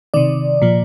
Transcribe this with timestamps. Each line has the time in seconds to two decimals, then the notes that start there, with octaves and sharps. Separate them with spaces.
0.14 C3 D#3 D5
0.62 A#2 F3